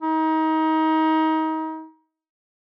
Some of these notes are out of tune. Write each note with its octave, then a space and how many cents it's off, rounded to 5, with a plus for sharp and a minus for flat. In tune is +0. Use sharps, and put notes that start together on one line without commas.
D#4 +25